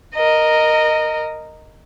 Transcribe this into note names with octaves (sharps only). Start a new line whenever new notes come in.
A#4 D#5